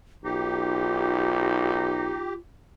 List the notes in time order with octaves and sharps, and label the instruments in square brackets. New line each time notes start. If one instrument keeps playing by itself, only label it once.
[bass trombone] B1 [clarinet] D#4 [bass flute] F4 [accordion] G4